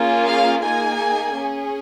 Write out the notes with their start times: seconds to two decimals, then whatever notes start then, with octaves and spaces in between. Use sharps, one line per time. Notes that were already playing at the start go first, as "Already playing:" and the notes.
Already playing: A#3 C#4 F4 G#4
0.27 F5
0.62 A#3 D#4 G#4 G#5
1.36 C#4 G#4